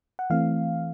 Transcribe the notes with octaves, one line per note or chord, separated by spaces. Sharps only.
F#5
E3 A3 C4 F5